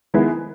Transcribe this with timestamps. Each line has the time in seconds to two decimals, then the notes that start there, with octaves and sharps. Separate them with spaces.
0.14 D#3 G#3 B3 E4